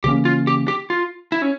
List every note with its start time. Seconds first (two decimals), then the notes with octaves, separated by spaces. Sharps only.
0.04 C#3 E3 A#3 C#4 G4
0.25 F4
0.47 G4
0.68 G4
0.90 F4
1.32 E4
1.42 C#4